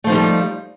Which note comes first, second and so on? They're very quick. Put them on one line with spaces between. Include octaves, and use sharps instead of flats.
A3 F3 D#4 A#3 G3